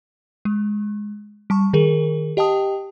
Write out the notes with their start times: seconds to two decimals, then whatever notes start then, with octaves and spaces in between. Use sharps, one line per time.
0.45 G#3
1.50 G3 A5 C#6
1.73 D#3 G#4 A#4
2.37 G4 D#5 G5 A5 D#6